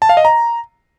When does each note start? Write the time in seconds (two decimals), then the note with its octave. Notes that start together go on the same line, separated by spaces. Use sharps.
0.02 A5
0.09 F5
0.17 D#5
0.25 A#5